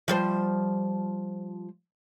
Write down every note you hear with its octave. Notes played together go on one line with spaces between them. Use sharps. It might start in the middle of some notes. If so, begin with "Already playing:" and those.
F3 G3 C5